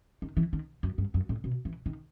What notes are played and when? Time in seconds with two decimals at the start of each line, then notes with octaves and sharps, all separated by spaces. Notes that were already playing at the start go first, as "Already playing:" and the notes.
0.22 D#3
0.37 E3
0.53 D#3
0.83 F#2
0.98 G2
1.14 F#2
1.29 A2
1.44 B2
1.65 E3
1.86 D#3